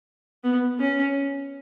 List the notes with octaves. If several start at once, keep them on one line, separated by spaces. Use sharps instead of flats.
B3
C#4